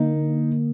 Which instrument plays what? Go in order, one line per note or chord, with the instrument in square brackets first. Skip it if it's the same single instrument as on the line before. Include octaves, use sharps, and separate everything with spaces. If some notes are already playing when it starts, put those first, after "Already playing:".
Already playing: [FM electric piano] D3 A#3 [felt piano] D#4